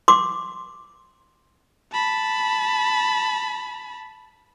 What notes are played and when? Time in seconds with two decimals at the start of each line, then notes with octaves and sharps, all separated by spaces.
0.08 C6 D6
1.92 A5 B5